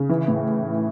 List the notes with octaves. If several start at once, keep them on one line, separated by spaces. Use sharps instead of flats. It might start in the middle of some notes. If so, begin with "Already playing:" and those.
Already playing: C#3
E3
A2